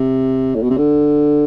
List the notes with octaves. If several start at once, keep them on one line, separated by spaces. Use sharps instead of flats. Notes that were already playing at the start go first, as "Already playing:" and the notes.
Already playing: C3
A2
B2
C3
D3